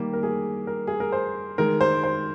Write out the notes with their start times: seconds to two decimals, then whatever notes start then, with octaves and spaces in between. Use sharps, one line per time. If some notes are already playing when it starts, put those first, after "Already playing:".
Already playing: D#3 G3 A#3 G4
0.13 A#4
0.23 G#4
0.67 A#4
0.87 G#4
1.00 A#4
1.12 C5
1.58 D#3 G#3 A#4
1.81 C5
2.04 C5